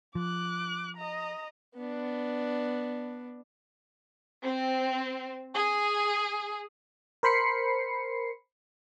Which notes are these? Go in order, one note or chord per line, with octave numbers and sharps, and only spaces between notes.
F3 D6 F#6
D#5 A#5
B3 D4
C4
G#4
A#4 C5 B5 C7 C#7